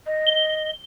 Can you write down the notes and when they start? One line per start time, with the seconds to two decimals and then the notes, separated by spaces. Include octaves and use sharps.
0.06 D#5
0.27 G7